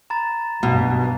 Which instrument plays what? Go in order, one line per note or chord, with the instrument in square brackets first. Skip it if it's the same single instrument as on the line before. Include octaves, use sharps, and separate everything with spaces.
[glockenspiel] A#5 B5 A6
[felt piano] B1 [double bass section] G2 [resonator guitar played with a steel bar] B2